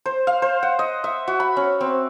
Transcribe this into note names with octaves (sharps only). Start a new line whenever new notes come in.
C5
F5
C5
F#5
D#5
E5
F#4
B5
C#4
C4